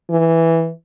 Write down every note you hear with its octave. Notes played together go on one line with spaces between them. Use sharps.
E3